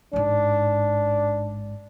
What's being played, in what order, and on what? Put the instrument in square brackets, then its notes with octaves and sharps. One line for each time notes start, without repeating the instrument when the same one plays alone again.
[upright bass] A1 G#2 [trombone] D4